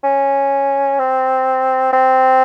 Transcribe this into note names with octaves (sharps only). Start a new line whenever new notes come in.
C#4
C4
C4